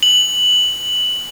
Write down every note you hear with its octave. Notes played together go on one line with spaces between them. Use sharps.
F#7